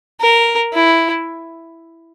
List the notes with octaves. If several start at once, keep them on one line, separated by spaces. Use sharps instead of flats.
A#4
E4